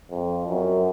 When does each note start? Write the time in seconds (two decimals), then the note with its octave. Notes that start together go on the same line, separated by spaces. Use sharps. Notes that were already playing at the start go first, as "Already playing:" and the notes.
0.10 F2
0.48 F#2